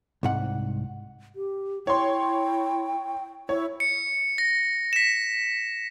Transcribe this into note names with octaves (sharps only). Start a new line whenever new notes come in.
C2 G#2 F#5
G4
E4 C#5 G5 C6
E4 C#5
C#7
A#6
B6 E7